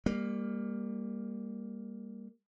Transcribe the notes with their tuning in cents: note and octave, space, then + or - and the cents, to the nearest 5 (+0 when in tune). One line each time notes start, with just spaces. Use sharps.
G3 +30 A#3 +0